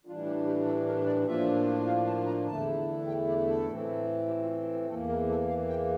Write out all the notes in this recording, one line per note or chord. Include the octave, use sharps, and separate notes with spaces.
A2 E3 G3 D4 F4
G4
G4
A4
A#4
D5
A2 F3 A#3 D4 F4 E5
F5
A5
A#5
E2 D3 A3 E4 A5
G5
D5
A4
A2 E3 A3 C4
G4
F4
G4
E2 E3 A#3 A4
A#4
A4
F5
G5